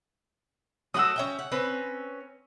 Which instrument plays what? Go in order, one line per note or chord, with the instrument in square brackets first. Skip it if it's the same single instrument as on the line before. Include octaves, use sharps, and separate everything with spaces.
[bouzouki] F#3 A3 F#4 [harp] D#6 E6
[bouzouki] C#4 E5 G5
F#5
C4 C#4 B4